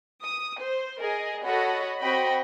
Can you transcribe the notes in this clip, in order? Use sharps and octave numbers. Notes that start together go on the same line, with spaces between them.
D#6
C5
G#4 A#4 D#5 G#5
F#4 A4 C#5 D#5 F#5 B5
C4 F#4 D#5 G5 B5